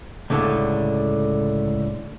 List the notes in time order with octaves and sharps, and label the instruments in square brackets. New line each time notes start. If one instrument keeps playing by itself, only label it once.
[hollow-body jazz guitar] C#2 A2 D3